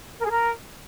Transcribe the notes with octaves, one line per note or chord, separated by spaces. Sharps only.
A#4
G#4
A#4